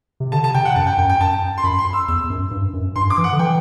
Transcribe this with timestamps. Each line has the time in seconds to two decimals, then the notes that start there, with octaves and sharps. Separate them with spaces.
0.20 C3
0.32 D3 A5
0.44 A5
0.54 C3 G5
0.65 F#5
0.76 F#2 A5
0.87 G5
0.98 F#2 G5
1.10 G5
1.20 F#2 A5
1.58 C6
1.64 F#2 B5
1.79 C6
1.93 E6
2.08 E2 E6
2.30 F#2
2.51 G2
2.73 F#2
2.96 G2 C6
3.10 D6
3.18 E3
3.24 F#5
3.32 D3
3.39 E3 G5